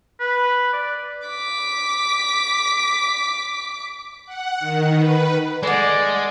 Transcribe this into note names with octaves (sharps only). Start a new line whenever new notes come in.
B4
D5
D6 B6
F#5
D#3
B4
G#3 A4 D5 F#5